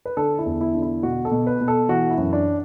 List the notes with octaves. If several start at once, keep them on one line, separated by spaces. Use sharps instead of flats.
B4
D3 A4
E4
E2
E4
D3
E4
B2 F#4
A4
B2
B4
B2
A4
E3 F#4
E4
F#2
D4